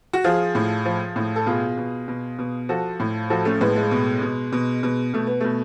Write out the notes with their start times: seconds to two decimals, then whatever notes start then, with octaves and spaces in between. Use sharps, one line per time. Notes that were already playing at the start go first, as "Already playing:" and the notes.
0.13 F#4
0.24 F3 F4 G#4
0.55 A2
0.85 F3
1.16 A2
1.36 A4
1.46 B2 F4 G#4
1.77 B2
2.08 B2
2.39 B2
2.69 F3 F#4 A4
3.00 A2
3.30 F3 F#4 A4
3.45 A3 C#4
3.61 A2 G#3 B3
3.76 G#3
3.91 B2
4.22 B2
4.52 B2
4.83 B2
5.14 B2 A3
5.27 B3
5.40 B2 A3